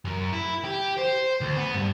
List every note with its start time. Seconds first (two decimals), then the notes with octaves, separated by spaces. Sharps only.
0.05 F#2
0.32 E4
0.64 G4
0.97 C5
1.41 D2
1.56 B3
1.74 G2